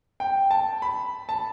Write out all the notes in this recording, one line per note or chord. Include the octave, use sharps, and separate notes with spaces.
G5
A5
B5
A5